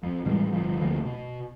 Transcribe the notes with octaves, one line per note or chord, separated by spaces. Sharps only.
F2
A2 E3 G3 G#3
G1 C#2 F3
D2 F3 A3 A#3
B2